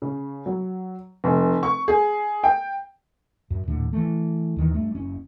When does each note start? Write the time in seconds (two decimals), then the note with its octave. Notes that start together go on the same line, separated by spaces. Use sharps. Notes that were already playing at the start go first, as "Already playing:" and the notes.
0.02 C#3
0.46 F#3
1.24 F1
1.63 C#6
1.88 G#4
2.44 G5
3.51 F#2
3.68 D#1 A2 D3
3.93 E3 A3
4.56 D#2 D#3 E3
4.74 G2 A3
4.95 F#1 C#4